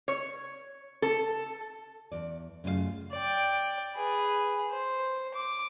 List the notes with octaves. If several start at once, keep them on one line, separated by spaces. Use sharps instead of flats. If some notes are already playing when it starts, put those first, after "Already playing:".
C#5
A4
E2 D5
F#2 C#3 A3 F4 G4 F5
D5 G5
G#4 B4
C5
D6